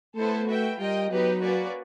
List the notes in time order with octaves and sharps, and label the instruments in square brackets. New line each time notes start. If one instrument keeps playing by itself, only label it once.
[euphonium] A3 [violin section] B3 E4 A4 C5
[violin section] F#4 B4 E5 G5
[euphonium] G3 [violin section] F4 A#4 D#5 G5
[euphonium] F#3 [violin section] B3 D#4 G4 B4
[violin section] A#3 C#4 F#4 B4 D5